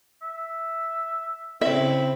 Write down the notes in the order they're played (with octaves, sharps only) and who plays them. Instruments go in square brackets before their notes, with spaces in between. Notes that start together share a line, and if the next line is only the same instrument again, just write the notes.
[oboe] E5
[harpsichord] C#3 E4 [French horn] C4 [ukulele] E5